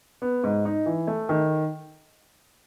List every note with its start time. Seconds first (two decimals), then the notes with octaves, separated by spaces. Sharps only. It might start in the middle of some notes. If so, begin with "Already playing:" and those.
0.22 B3
0.44 G#2
0.65 D#4
0.86 E3
1.07 A3
1.29 D#3